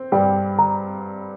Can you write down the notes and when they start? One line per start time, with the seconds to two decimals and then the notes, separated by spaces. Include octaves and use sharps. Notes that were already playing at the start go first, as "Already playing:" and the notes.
Already playing: C4
0.12 G2 G3 G5
0.59 A#5